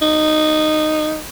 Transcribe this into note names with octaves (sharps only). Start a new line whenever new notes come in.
D#4